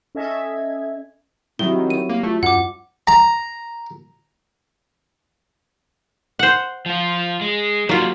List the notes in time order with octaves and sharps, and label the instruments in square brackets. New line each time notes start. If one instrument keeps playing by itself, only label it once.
[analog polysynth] C#4 A4 D#5 E5 G#6
[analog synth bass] D#3 [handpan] F#3 G3 E4 [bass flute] C4 [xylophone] G7
[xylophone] D#7
[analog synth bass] A#3
[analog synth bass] A3 [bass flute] F4
[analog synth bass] F#2 [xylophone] F#5 D6
[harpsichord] A#5
[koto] C5 F#5
[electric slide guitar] F3 F4
G#3
[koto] F#3 F4 [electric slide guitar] G3 A#3